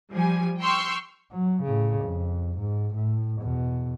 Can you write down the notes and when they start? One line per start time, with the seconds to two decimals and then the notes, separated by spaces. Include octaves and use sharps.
0.11 F3 G3 G#5
0.61 G5 C6 C#6 E6 F6 G6
1.32 F#3
1.63 A2 C#3
2.01 F2
2.58 G#2
2.94 A2
3.42 E2 B2